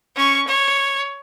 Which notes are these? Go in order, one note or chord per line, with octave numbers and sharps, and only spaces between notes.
C#4 C#6
C#5